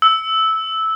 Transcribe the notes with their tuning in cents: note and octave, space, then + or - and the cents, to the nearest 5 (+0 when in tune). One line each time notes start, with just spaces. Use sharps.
E6 -10